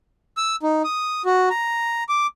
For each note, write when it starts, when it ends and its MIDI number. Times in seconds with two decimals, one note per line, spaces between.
0.37 0.56 88
0.63 0.82 63
0.84 1.22 87
1.25 1.49 66
1.50 2.04 82
2.09 2.27 86